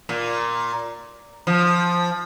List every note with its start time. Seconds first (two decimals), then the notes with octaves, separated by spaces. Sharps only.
0.09 A#2
1.47 F3